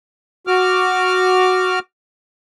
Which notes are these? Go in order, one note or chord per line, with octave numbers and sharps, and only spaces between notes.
F#4 D6 F6